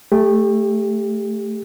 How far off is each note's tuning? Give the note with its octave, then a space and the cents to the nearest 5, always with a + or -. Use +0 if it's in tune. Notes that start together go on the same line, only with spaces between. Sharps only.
A3 +0 G4 +25